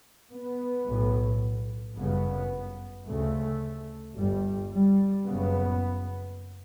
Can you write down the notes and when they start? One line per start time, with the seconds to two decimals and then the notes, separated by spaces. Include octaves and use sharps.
0.31 B3
0.85 B1 A2
1.95 G1 F#2 C#3 B3
3.06 D2 C#3 A3
4.16 G1 G2 G3
4.71 G3
5.26 F#1 F#2 C#3 B3